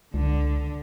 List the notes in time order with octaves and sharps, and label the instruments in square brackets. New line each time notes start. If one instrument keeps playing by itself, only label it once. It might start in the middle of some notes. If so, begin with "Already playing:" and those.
[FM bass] C#2 [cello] D3